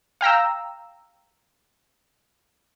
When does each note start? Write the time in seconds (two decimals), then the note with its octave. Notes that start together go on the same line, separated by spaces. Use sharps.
0.21 F5 G5 A#5 E6